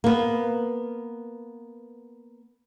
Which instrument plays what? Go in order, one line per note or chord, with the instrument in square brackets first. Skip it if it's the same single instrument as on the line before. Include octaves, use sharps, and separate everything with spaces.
[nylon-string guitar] A#3 B3